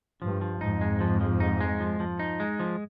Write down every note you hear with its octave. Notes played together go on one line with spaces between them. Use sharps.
G2 F3
F3
F2 G#2 D#4
G#3
F3
F3
D#4
G#3
F3
F3
D#4
G#3
F3